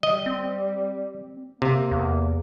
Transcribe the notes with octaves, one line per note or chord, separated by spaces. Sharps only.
G3 D#5
C4
C3 A#3
E2 A#3